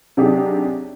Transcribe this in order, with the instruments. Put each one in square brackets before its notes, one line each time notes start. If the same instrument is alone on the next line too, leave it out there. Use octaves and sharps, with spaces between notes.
[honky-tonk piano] C3 F#3 D4 D#4 G4 G#4